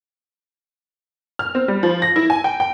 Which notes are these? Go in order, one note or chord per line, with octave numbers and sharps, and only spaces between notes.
F6
C4
G3
F3
A#6
E4
G#5
G5
G5